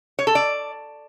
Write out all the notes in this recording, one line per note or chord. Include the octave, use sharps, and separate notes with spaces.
C#5
A4
D5